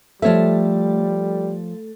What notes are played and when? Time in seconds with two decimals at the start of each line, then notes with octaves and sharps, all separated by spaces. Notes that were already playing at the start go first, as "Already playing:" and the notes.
0.22 F3 G3 A3 A4 C#5 E5